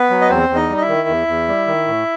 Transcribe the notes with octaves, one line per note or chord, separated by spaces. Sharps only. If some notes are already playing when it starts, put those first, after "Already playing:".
Already playing: B3 B4
F#3
D#5
E2 C4 C5
E2
D#4 D#5
G3
D#5
E4 E5
D#3
E2
E2
G3
D#3
A2